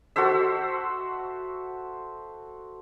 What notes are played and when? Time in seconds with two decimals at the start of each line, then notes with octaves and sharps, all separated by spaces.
0.16 F#4 A4 C5 E5